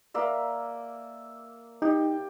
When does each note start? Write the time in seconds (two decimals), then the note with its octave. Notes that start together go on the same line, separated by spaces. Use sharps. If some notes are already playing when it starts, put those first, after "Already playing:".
0.14 A#3 D5 E5
1.82 D#4 G4